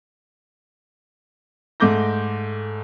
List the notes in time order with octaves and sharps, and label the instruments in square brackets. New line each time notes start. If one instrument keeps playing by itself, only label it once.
[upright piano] G#2 A3 D6 G6 A#6